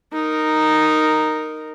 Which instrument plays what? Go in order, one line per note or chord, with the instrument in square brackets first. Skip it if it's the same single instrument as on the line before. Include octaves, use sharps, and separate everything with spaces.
[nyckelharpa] D#4 A#4